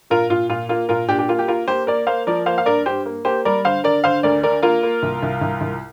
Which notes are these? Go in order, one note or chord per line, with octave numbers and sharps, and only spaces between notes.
A#2 F4 A#4
A#2 F4
A#2 F4
A#3 F4
A#2 F4 A#4
A#2 D4 G4
G4
A#3 F4
G4
A#3 F4 A#4
A#3 G4 C5
A#3 A#4 D5
A#3 C5 F5
F3 A#4 D5
A#3 C5 F5
F5
G2 A#4 D5
G2 G4 C5
A#3
A#3 G4 C5
G3 A#4 D5
D3 C5 F5
D3 A#4 D5
D3 C5 F5
D2 A#4 D5
D3 A#4 D5
A#3 F4 A#4
A#3
C2
C2
C2
C2